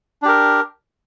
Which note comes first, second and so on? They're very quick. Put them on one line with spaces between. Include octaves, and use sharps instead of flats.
D4 G4 A#4